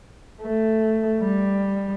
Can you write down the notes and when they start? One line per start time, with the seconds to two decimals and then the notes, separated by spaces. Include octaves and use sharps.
0.43 A3
1.22 G3